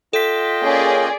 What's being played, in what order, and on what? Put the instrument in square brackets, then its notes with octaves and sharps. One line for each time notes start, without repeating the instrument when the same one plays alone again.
[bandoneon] F4 D#5 G5 [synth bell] A4 B6
[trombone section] A#3 C#4 [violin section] G#4 D5